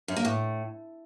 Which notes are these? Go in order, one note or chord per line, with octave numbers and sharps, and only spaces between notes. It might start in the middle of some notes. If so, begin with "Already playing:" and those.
F#2
A#3
A2